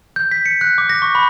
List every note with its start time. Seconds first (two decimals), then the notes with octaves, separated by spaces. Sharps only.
0.16 G6
0.31 B6
0.46 C#7
0.61 F#6
0.78 D6
0.90 A#6
1.02 C#6
1.15 B5